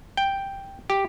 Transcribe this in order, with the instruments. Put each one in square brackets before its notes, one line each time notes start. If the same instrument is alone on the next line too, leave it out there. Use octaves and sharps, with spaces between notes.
[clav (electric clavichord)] G5
G4